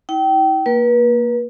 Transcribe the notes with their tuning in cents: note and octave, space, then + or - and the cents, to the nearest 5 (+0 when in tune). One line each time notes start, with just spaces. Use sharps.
E4 -45 G5 -25
A#3 +0 B4 -35